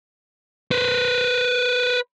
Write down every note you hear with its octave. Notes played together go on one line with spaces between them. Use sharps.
B4 C5